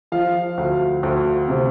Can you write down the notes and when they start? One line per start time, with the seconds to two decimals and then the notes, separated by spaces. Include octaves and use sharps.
0.12 F3 F5
0.58 D2
1.03 D2
1.48 C3